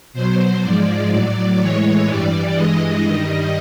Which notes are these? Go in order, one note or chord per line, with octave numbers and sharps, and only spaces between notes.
B2 F#3 C5
G#2 F3 G#3 D5
A2 F#3 D5
A2 E3 G#3 C#5
G2 E3 G3 D5
G2 E3 G#3 D#5
G2 D#3 G3 D#5